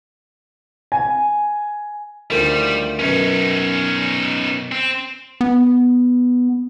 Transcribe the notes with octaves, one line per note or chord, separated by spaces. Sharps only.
G#5
D2 D#3 F3 G3
F#2 B2 C#4 D#4
C4
B3